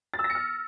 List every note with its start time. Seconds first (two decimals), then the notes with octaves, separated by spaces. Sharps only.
0.14 A6
0.19 E6
0.24 A#6
0.30 C#7
0.35 F6